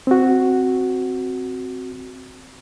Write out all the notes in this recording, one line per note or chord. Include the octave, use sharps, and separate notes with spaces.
C4 F#4